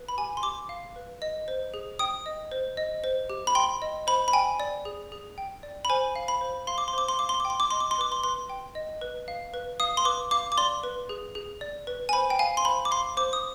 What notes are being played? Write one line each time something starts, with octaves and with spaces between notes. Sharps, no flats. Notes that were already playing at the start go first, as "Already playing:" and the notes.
Already playing: B4
B5
G4 G#5
C6
G4 D6
F5
B4
D#5
C5
G#4
G5 D#6
D#5
C5
D#5
C5
G4
B5
G5 C6
D#5
C5 B5
B5
G5 G#5
D5
G#4
G#4
G5
D5
B5
C5 G#5
F5
B5
C5
F5 C6
D6
C6
C5 D6
C6
F5 D6
C6
G5 D6
C6
D6
D#5 C6
D6
C6
B4 D6
C6
B4 C6
G5
D#5
B4
F5
B4
F5 D#6
C6
B4 D6
F5 D6
D6
D5 C6
B4
G#4
G#4
D5
B4
G#5
C5 B5
G5
F5 G#5
C6
C5 B5
D6
F5 C6
C5 D6
D#6